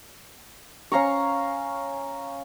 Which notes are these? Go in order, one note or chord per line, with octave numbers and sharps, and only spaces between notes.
C#4 F5 A#5 C#6